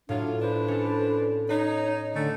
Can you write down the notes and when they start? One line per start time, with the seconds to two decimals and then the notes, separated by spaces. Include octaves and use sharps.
0.09 A2 F#3 D4 F4
0.41 F3 D4 B4
0.68 C#4 A4
1.49 D#4 B4 C#5
2.14 D3 A3 C#4 D5